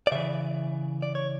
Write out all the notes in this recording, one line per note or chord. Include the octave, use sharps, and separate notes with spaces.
D5
C#3 E3 E5
D5
C#5